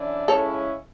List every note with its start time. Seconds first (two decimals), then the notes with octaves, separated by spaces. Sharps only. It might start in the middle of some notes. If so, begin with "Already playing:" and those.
Already playing: F#2 E3 D4
0.28 C#3 G#3 C#4 E4 A4 C#5